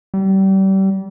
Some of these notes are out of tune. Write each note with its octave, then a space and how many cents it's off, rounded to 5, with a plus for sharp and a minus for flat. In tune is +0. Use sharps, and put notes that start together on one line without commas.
G3 -30